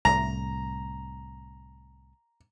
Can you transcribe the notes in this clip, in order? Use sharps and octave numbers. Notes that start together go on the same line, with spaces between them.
C2 A2 A#5